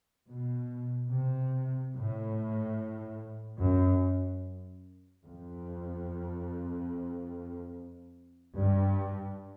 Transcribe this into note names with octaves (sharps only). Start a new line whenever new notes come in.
B2
C3
A2
F#2
F2
G2